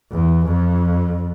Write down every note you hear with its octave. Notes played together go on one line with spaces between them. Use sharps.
E2
F2